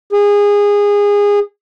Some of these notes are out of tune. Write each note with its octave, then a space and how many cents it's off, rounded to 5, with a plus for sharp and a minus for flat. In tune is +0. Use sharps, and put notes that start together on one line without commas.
G#4 -25